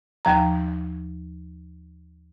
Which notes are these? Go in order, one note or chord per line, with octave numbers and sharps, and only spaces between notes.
D#2 F3 A#5